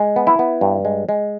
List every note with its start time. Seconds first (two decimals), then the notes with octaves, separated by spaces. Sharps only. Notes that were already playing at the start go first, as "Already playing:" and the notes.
Already playing: G#3
0.16 B3
0.27 E4
0.39 B3
0.61 G2
0.85 G#3
1.09 G#3